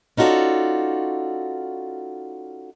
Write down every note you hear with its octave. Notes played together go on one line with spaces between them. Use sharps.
C#4 D#4 F4 F#4 A4 D5